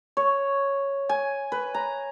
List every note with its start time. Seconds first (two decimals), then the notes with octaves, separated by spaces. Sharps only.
0.17 C#5
1.09 G#5
1.52 B4
1.74 A#5